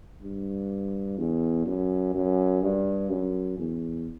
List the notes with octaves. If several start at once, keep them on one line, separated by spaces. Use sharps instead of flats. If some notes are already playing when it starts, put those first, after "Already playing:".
G2
E2
F#2
F#2
G2
F#2
E2